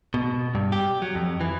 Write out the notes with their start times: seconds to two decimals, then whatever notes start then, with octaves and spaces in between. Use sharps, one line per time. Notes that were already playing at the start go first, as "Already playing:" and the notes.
0.14 B2
0.55 G2
0.72 G4
1.02 F#3
1.15 F2
1.41 E3